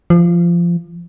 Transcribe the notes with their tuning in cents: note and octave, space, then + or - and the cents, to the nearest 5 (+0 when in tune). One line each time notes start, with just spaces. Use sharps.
F3 -20